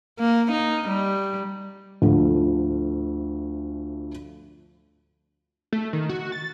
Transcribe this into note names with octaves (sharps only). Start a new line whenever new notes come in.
A#3
D#4
G3
D2 F3 A3
A3
D#3
F#4
A6